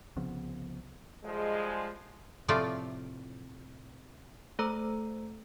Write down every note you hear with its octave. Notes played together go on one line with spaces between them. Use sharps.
C2 C#3 F3 B3
F3 G3 G#3
A2 C3 F3 A3 F4 D5
A3 A4 C5 A#5 E6